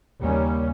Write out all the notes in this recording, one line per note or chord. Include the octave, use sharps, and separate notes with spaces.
D#2 C#3 G3 C#4